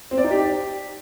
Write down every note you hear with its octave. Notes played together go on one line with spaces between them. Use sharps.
C4
D5
D#4
G4